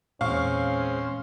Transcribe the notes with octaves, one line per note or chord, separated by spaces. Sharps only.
E2 A#2 G#3 C4 C#4 C5 F5 C#6